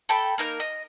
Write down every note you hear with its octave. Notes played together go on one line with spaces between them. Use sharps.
A4 G5 B5
A#3 D#4 A#4 G6
D#5